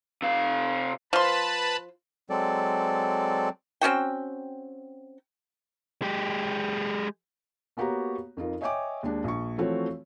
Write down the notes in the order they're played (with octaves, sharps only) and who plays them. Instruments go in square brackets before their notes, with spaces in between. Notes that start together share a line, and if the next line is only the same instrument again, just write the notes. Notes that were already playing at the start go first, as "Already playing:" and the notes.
[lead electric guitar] C3 F5
[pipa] F3 C6 [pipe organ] B4 A5 B5
[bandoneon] F#3 G#3 C4 A4 D5
[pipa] C4 C#4 F#4 G5
[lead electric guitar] G#3 G4
[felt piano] A#3 B3 F#4 G4 C#5 A#5
F2 D#4 F4 A#4
C#5 D#5 E5 G5 G#5 D6
D#2 G#3 D4
A#1 C#6
E3 F3 A3 C4 F#4 C#5